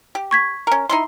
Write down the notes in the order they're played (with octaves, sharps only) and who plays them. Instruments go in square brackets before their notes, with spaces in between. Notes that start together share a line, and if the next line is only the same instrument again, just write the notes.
[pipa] G4
[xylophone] C#6 G#6 B6
[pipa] C#4 A#4
D#4 E4 C6